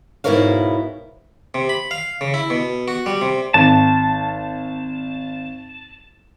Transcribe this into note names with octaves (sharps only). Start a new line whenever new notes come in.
G#2 B2 E4 A#4 C#5 F5
C3
B5
F5
C#3
E4
B2
F#4
G3
C3
G#1 A5